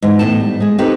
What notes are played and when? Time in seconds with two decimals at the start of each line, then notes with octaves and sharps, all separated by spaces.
0.02 G#2 E3
0.19 E2 A2 A5
0.40 G3
0.60 G#3 G#4
0.78 C4 D#4 G4 A4 B4